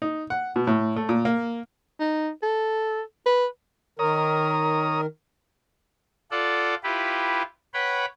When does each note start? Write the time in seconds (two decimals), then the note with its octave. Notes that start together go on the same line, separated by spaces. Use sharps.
0.02 D#4
0.30 F#5
0.56 B2
0.67 A2
0.96 A3
1.09 A#2
1.25 A#3
2.00 D#4
2.43 A4
3.26 B4
3.99 D#3 A#4 C#5 A#5 D#6
6.31 F4 A4 D5 F#5
6.83 E4 F4 G4 B4
7.74 B4 C#5 F#5 G5 B5